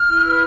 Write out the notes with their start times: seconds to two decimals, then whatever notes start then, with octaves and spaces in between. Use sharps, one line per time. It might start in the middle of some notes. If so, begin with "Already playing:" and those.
Already playing: F6
0.09 E4
0.25 B4